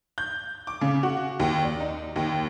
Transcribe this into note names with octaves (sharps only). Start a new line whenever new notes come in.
G6
D6
C#3
F#4
D#2
D5
D#4
D#2